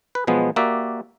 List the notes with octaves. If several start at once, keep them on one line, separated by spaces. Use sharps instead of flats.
B4
B2 F3 F#3 G#3 B3
A#3 F#4 G4 D5 E5